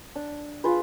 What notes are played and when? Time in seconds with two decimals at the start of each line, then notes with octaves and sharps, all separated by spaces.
0.15 D4
0.64 F4 G#4 B4